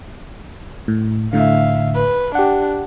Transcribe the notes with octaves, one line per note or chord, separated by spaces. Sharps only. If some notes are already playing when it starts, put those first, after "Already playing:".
A2
A2 D3 E5 F5
B4
D4 G4 F#5